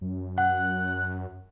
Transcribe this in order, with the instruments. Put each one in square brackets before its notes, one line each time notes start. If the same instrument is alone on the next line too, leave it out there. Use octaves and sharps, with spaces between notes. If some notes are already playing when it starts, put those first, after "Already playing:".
[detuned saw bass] F#2
[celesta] F#5 [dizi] F#6